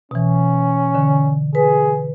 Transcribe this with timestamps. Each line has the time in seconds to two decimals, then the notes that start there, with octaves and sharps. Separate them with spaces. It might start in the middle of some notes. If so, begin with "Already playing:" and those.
0.11 B2 E3 C#4
0.95 D3
1.55 G#4 B4